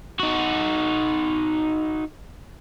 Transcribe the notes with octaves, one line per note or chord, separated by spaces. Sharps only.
D#4 F#4